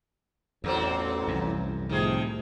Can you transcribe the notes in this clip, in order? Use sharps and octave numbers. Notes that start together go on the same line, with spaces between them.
A1 E2 A#2 F#3 C4
C2 F#2 E3
A2 C3 D#3 F3 G#4